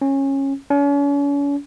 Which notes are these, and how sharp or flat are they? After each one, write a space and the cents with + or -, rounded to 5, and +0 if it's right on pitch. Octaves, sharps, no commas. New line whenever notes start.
C#4 -20
C#4 +40